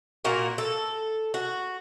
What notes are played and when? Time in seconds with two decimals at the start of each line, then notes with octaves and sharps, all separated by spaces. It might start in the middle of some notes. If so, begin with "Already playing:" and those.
0.25 A#2 A#3 F#4 A#4
0.58 A4
1.34 F#4